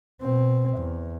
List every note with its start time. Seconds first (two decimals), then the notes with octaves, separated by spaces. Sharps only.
0.21 B2 C4
0.77 E2